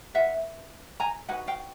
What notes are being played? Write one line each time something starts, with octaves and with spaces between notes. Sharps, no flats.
F4 G#4 B4 E5 F#5
G#5 A#5
D#4 F#4 B4 F#5 G#5
F5 G5